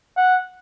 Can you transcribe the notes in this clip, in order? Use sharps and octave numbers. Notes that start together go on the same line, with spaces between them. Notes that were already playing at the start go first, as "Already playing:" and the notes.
F#5